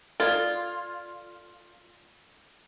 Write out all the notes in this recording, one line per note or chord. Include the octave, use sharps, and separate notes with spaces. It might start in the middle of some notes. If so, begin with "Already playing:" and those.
F4 A4 D5